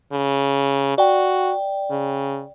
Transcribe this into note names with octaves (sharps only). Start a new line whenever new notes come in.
C#3
F#4 D5 G5
C#3